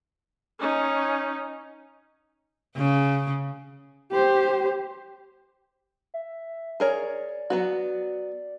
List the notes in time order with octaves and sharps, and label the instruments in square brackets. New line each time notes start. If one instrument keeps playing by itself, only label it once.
[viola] C#4 D#4
[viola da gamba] C#3
[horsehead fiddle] G4 C5
[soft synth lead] E5
[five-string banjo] G#4 A#4 C#5 [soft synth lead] D5
[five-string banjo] F#3 B3 F#4